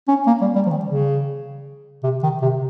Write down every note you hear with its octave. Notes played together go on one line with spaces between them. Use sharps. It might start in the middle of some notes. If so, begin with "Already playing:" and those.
C#4
A#3
G3
G3
F3
D#3
C#3
C3
D#3
C3